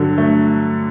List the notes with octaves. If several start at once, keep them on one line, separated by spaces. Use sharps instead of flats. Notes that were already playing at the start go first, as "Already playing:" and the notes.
Already playing: G2 D3 F#3
A3